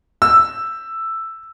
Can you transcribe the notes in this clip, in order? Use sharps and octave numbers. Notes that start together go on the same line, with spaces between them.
E6